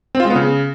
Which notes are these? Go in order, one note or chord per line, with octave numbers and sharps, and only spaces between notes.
C4
F4
G#3
B3
C#3